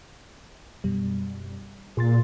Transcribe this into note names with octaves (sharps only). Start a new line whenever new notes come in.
F#2 B2 G3
A#2 G#4 C6 A6